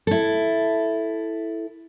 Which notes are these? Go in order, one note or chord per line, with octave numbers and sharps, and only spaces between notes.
E4 A4